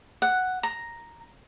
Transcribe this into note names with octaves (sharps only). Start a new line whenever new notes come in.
F#5
A#5